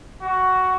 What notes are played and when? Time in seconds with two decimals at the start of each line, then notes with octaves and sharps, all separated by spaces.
0.21 F#4